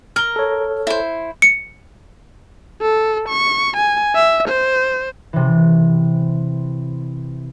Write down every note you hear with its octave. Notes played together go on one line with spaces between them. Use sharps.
A#4 A#5 F6 G7
A4 C#5
E4 C5
C#7
A4
C#6
G#5
E5
C5
C3 E3